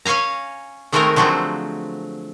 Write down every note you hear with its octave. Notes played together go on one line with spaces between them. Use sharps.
C#4 C#5 F5 G#5 A#5
D#3 G#3 A3 C4 C#4 A#4
D3 F3 F#3 G#3 A3 C4